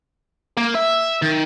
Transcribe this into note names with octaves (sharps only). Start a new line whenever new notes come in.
A#3
E5
D#3